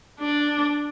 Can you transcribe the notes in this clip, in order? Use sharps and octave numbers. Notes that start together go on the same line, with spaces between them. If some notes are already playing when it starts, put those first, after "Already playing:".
D4